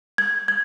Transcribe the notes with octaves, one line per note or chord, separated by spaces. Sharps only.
G#6
G#6